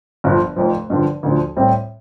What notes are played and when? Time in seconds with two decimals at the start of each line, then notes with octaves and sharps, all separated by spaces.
0.24 G1 G2 F3
0.56 F1 F2 F3
0.90 G2 D3 F3
1.23 D2 D3 F3
1.56 A2 G3 C4